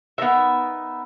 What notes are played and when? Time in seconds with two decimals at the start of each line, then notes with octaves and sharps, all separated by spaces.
0.18 B3 D#4 A#4 E5